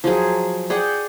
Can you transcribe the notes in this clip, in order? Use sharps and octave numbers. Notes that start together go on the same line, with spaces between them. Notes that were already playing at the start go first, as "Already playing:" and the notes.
F3 F#3 G#4
G#4 D5 F#5 G5